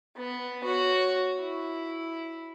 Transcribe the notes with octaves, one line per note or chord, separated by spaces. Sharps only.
B3
F#4 C#5
E4